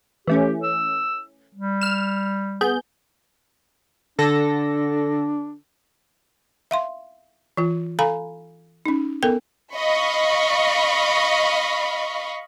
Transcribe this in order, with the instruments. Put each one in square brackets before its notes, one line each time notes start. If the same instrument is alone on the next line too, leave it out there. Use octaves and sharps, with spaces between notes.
[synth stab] E3 A3 C#4 [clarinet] G4
[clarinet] E6
G3
[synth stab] F6 E7
B3 G#4 G6
[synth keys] D3 A4 A#6 [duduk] D4
[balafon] E5 F5 C6
E3 F4
A4 F5 G#5 A#5 B5
C#4 D#4
B3 A4 A#4 G5
[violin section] D#5 F5 B5 C#6